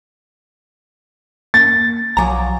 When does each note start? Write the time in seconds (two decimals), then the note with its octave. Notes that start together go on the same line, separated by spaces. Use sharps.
1.54 A#3 A6
2.17 B1 F3 F#3 G#5 A#5 D6